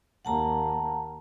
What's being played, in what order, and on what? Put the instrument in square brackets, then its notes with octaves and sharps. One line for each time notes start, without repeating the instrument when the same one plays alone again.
[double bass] D#2 A#3 [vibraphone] F#5 A5 A#5